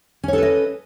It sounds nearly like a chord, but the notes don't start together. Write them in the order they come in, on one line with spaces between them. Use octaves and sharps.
C#4 C#5 A4 B4 D#5